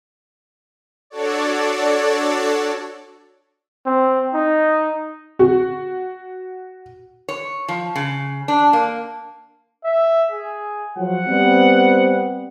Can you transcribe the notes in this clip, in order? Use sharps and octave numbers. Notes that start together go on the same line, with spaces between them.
D4 F#4 A4 C#5 D5
C4
D#4
F#4
C#5
F3
C#3
D4
A#3
E5
G#4
F3 F#3 F#5
G3 B3 C4